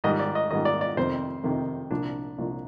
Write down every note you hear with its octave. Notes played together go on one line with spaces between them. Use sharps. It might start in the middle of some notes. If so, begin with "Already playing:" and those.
G#2 D#3 G3 D#5
D5
D#5
G#2 D#3 G3 D#5
D5
D5
F2 C3 D#3 C5
F2 C3 D#3
C2 A#2 F3 D4
C2 A#2 F3